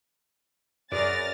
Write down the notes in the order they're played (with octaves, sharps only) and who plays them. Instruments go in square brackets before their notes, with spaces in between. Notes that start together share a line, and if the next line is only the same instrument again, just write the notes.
[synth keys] F#2 [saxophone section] G#4 B4 D5 [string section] F6 A6 A#6